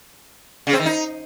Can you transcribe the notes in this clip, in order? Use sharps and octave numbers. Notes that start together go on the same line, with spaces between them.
C#3
C4
D#3
D#4